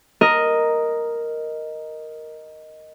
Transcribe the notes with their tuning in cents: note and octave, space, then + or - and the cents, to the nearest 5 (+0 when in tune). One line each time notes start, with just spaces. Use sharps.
A#4 +0 D#5 +0